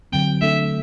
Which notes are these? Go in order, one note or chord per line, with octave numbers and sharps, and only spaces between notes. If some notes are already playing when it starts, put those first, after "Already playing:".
D3 F#3 C4 G5
A3 D4 A4 E5